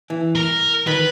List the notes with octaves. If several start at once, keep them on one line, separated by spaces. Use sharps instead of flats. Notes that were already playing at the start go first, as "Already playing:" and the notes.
E3
A#4
D#3 B4